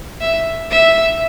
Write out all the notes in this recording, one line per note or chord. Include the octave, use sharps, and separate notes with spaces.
E5
E5